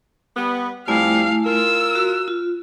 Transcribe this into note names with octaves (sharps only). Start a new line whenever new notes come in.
G3 B3
F2 F3 G3 A3 E4 F5 G#5
F4 A#4 E6
F#4
F4